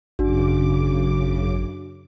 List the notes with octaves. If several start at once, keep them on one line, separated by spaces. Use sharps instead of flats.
G#1 F#2 C#3 D4 F#4 D6